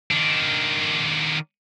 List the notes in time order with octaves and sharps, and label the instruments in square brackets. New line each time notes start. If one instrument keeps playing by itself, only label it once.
[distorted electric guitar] D#3 D4